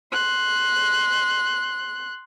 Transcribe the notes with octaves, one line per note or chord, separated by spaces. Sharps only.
C6 F#6